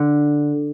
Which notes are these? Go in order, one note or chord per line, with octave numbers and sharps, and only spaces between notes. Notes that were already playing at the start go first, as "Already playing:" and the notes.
Already playing: D3